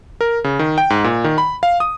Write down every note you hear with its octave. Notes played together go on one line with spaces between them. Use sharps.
A#4
C#3
D#3
G5
G#2
A#2
D#3
B5
F5
D#6